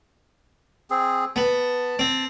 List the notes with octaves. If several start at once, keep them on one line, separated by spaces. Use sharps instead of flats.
C4 G#4
B3 A5
C4